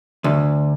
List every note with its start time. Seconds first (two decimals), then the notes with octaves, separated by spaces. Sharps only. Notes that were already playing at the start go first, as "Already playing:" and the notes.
0.24 D2